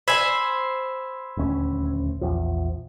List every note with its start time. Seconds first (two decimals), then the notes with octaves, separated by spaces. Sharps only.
0.08 C5 G#5 B5 E6 G#6
1.37 D#1 D2 C#4
2.21 A#1 E2 F3